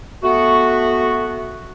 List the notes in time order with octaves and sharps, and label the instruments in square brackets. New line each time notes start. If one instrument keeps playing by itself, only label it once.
[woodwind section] A3 B3 F#4